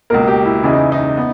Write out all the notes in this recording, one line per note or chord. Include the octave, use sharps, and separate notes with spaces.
C#2 B2 A#3 A#4
G4
E4
E2 C#3 E3 G#3 E4
D#4
D#4
B3